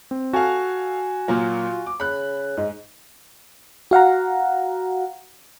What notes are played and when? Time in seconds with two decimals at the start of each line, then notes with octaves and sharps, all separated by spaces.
0.11 C4
0.33 F#4 A4 F5 G#5
1.28 A#2 F#3 A#3 F4
1.86 D6
2.00 C#3 B5 F#6
2.57 G#2 G#3
3.91 F#4 F5 F#5 A#5